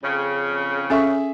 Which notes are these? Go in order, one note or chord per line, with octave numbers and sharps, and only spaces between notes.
F2 C#3
C#4 G#4 A4 E5 C#6